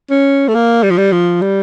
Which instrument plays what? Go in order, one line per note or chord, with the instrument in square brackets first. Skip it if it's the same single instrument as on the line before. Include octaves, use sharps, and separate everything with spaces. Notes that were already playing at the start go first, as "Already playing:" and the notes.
[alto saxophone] C#4
A3
A#3
G3
F3
G3
F3
G3